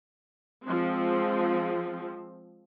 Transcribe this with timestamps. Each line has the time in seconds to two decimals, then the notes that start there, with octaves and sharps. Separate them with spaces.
0.65 F3 G#3 C4